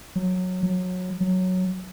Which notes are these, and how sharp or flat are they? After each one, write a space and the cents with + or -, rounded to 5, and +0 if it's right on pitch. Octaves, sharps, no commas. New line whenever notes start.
F#3 -15
F#3 -20
F#3 -5